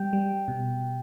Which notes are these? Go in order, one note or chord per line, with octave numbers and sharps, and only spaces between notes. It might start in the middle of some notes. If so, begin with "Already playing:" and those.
Already playing: G3 G5
G3
B2